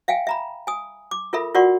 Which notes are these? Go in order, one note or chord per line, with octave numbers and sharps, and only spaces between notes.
E5 F5 G5 G#5
E5 A#5 B5
G#5 D#6
D6
F4 A4 A#4 E5 B5
F4 F#4 A#4 D5 F#5 C#6